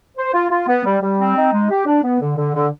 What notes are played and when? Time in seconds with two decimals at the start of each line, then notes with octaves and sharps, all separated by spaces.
0.17 C5
0.34 F4
0.50 F4
0.67 B3
0.85 G3
1.01 G3
1.18 C4
1.35 D#4
1.53 G#3
1.70 G4
1.86 D4
2.03 B3
2.20 D3
2.37 D3
2.55 D3